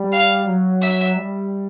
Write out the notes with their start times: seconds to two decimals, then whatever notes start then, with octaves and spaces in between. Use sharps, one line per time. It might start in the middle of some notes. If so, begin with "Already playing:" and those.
Already playing: G3
0.12 F5
0.46 F#3
0.81 E5
1.16 G3